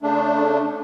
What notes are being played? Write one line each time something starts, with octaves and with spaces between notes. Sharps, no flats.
C#3 A3 D4